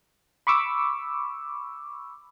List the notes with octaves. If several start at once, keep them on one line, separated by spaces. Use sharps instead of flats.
B5 C#6 D6 E6